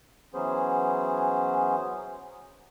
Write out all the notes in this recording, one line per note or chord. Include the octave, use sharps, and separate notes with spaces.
E3 F#3 B3 C#4 G#4 C5